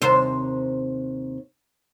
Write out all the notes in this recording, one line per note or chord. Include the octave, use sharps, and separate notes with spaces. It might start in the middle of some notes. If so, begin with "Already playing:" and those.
D#2 C3 C5